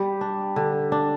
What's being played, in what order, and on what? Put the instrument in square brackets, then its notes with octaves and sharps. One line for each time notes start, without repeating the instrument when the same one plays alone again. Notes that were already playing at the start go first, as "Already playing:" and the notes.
Already playing: [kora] G3 [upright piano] G4
[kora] D4
D3
D4